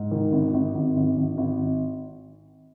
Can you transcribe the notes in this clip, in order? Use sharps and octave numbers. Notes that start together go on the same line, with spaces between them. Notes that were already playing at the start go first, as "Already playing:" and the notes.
Already playing: G#2
D#3
G#1
G#1
G#1
G#1
G#1
G#1